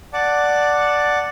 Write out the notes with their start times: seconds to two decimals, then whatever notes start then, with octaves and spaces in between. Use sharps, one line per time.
0.13 D5 F#5 A5 D6